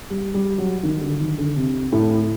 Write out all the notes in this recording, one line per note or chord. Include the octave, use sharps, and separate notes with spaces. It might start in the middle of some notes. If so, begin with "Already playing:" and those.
G3
G3
F#3
D#3
D3
D#3
D3
C3
A2